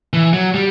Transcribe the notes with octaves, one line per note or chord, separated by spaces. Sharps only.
E3
F#3
G3